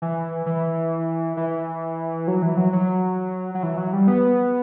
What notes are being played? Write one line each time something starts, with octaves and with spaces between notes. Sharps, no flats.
E3
E3
E3
F#3
E3
F#3
F#3
F#3
E3
F#3
G3
B3